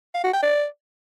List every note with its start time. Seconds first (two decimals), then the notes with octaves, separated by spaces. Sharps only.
0.14 F5
0.24 F#4
0.33 G5
0.43 D5